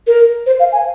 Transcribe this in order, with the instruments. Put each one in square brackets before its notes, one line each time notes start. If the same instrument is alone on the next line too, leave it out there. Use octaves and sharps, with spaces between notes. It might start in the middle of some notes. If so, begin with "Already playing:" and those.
[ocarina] A#4
C5
F5
G#5